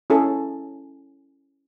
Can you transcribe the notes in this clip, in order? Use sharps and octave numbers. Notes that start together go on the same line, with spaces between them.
C#4 E4 G#4 A4